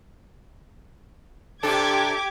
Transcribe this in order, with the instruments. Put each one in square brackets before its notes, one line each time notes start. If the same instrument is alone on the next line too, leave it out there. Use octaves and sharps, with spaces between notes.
[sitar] C3 D4 [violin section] G4 D6 G#6 [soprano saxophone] A4